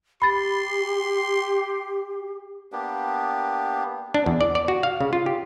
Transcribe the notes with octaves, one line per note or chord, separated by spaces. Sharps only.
G4 B5 C6 A6
A#3 B3 D4 G4
D4
E2
D5
D5
F#4
F5
C#3
F4
G4